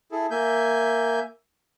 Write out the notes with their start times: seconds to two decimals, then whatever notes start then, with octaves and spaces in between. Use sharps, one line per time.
0.12 E4 G#4 A4
0.31 A#3 E5 G#5 G6